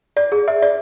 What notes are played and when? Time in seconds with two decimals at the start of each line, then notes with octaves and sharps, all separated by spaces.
0.17 D5
0.32 G#4
0.48 E5
0.62 D5